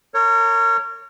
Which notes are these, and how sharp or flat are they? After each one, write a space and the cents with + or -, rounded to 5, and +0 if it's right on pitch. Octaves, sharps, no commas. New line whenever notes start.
A#4 -35 C#5 +0